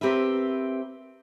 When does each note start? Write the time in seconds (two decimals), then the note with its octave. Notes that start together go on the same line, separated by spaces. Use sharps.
0.01 C4 G4 A#4 B4 E5